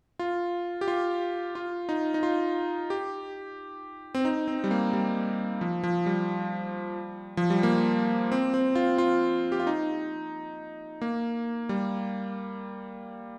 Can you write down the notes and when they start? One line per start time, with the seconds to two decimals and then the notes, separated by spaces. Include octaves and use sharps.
0.19 F4
0.81 G4
0.88 F4
1.55 F4
1.89 D#4
2.14 D#4
2.23 F4
2.90 G4
4.15 C4
4.25 D#4
4.48 C4
4.64 G3
4.71 A#3
4.93 G3
5.61 F3
5.84 F3
6.06 G3
7.37 F3
7.50 G3
7.63 A#3
8.32 C4
8.54 C4
8.75 F4
8.98 F4
9.52 G4
9.60 F4
9.67 D#4
11.02 A#3
11.69 G3